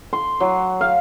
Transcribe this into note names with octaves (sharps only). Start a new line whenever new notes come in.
C6
F#3
F5